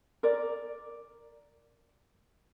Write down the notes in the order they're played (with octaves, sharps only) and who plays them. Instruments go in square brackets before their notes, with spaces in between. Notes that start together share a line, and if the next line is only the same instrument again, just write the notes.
[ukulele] A#4 D5